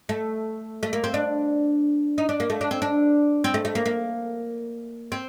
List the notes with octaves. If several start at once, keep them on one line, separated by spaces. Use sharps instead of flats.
A3
A3
A#3
C4
D4
D#4
D4
A#3
A3
D4
C4
D4
C4
A3
A3
A#3
A#3
C4